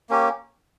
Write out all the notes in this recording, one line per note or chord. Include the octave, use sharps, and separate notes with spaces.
A#3 C#4 G4